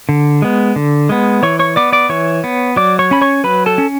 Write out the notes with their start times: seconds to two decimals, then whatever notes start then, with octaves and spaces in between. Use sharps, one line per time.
0.09 D3
0.42 G#3 B3
0.76 D3
1.09 G#3 B3
1.43 E3 C#5 C#6
1.59 C#5 C#6
1.76 B3 D5 D6
1.93 D5 D6
2.09 E3 C#5 C#6
2.44 B3
2.76 F#3 D5 D6
2.99 C#5 C#6
3.11 C#4 B5
3.21 C#5 C#6
3.44 F#3 B4 B5
3.66 A4 A5
3.78 C#4